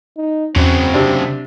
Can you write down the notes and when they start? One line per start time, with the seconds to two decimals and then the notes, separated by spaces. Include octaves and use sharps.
0.17 D#4
0.56 E2 C#3 F#3 C4
0.94 C3 D4